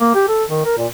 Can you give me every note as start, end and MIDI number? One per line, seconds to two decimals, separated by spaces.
0.01 0.11 58
0.15 0.26 67
0.28 0.44 69
0.50 0.62 51
0.65 0.77 70
0.78 0.87 46